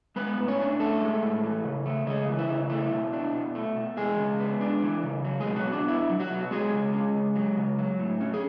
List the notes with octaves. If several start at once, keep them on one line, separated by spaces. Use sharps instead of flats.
G#3 B3 B4
A2
C#4 C#5
D4
A2 A3 A4
G#3
A2
E3
C#3
A3
C#3 G#3 G#4
E3
E4
C#3
A3 E4
B2
D4
B2
A3
B2
E3 G#3 G#4
C#3
B3
D4
E3
C#3
F#3
G#3 G#4
B2
F#3 F#4
B3 D4
D4 E4
F#3
F#3 F#4
B2
F#3 G#3 G#4
C#3
C#4
C#3
F#3
C#3
F#3
A2
C#4
G#4